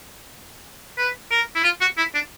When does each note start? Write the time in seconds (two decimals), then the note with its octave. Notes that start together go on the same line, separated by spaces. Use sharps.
0.98 B4
1.31 A#4
1.55 E4
1.64 F4
1.81 F#4
1.97 E4
2.14 D4